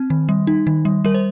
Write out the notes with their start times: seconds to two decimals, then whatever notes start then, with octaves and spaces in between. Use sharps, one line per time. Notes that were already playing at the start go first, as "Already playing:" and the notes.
Already playing: C4
0.10 D#3
0.29 G3
0.47 D#4
0.67 D#3
0.85 G3
1.05 G3 A#4
1.14 C5